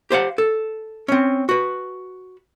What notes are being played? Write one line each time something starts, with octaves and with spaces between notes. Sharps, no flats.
G4 C5 F5 F#5
A4
C4 C#4
F#4 B4